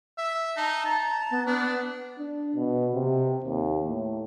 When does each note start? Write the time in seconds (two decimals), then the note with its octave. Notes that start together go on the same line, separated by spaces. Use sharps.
0.18 E5
0.57 D#4 A5
0.85 A5 A#5
1.31 B3
1.46 B3 D4
2.18 D4
2.56 B2
2.94 C3
3.44 D#2
3.88 A2